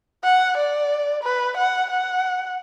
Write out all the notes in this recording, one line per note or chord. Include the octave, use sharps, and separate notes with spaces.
F#5
D5
B4
F#5
F#5